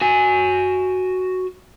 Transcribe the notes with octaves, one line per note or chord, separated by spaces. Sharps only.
F#4 G#5